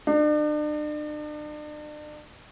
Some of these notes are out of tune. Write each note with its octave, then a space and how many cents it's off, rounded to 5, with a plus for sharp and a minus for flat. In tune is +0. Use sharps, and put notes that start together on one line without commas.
D4 +40